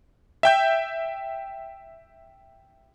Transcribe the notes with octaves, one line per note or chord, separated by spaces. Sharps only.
E5 G5 G6